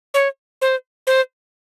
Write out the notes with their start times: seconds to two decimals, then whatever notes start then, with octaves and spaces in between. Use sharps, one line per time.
0.14 C#5
0.62 C5
1.07 C5